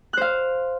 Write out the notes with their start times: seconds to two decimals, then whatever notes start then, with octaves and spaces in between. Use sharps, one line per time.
0.13 F#6
0.17 C5
0.21 F5